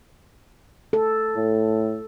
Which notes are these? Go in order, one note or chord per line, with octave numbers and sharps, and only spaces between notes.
A4
A2